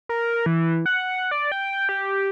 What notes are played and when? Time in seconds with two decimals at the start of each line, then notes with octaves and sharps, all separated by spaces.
0.09 A#4
0.46 E3
0.86 F#5
1.31 D5
1.52 G5
1.89 G4